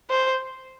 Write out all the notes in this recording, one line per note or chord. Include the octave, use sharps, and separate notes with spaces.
C5